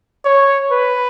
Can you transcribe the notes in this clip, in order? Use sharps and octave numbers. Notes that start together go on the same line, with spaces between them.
C#5
B4